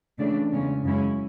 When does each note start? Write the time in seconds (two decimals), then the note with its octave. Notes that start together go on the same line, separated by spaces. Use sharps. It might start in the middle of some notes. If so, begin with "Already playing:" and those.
0.19 C#3 E3 A3 D4
0.52 E2 C#3 G#3 C#4
0.83 F#2 C#3 G#3 C#4 E4